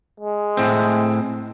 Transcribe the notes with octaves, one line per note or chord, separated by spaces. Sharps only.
G#3
A2 C4